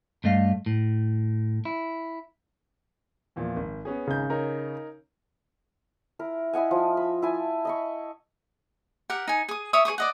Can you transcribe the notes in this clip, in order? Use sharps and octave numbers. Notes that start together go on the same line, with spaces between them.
G2 A3 D#5 F5
A2
E4
E2 A#2 F3
G#1
B3 C#4 G#4
G#1 C#3 D#4 G6
D#4 A#4 C#5
E4 A#4
E4 D#5 F#5 G#5
F3
B5
E4 G#5 A5
D#5 B5 C#6
G4 A#4 F#5
D#4 G#5
G#4 D#6
C#5 E5 C#6 D#6
G#4 C#5 C#6 D#6
D5 D#5 F#5